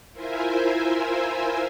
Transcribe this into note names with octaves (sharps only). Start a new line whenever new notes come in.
E4 F4 A#4 C5 E5 G#5